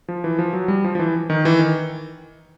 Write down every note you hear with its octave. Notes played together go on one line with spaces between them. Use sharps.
F3
E3
F3
F#3
G3
F3
F3
E3
D#3
E3
D#3